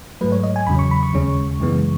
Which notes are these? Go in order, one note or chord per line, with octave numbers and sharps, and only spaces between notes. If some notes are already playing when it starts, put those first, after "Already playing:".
G#2 F#3 A3 B4
C#5
D#5
G#5
E2 C#3 F#3 B5
C#6
B5
C#6
D#2 C#3 G#3 C#4
F#2 C#3 E3 G#3 B3